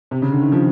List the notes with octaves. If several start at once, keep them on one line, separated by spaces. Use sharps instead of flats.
C3
C#3
D3
D#3
F3